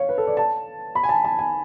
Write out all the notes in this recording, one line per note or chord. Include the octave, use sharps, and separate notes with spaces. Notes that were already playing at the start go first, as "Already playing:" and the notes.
Already playing: C#5 F5
B4
A4
D5
A5
B5
G#5
A5
A5
G#5